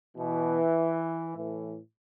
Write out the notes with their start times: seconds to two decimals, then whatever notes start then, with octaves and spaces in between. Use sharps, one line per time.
0.16 B2 E3
1.35 A2 E3